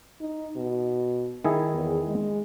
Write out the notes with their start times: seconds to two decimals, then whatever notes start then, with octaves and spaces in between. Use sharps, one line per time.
0.20 D#4
0.56 B2
1.44 D#3 E4 G#4
1.74 E2
2.07 G#3